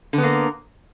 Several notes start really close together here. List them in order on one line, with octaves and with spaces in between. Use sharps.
D3 B3 A#3